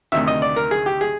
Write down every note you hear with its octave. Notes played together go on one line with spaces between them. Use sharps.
D2 C3 D#3 E5
D#5
D5
A#4
G#4
G4
G#4